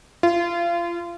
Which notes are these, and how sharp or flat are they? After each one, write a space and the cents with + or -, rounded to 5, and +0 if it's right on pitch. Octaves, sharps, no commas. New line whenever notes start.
F4 -30